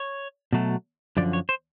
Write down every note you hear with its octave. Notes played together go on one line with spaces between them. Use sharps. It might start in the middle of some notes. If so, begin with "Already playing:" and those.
Already playing: C#5
B2 F#3 A3
F#2 D3 F3 D5
C#5
C5